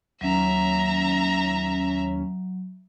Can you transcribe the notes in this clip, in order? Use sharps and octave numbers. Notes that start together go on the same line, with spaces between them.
D#2 F#3 C#4 E5 A#5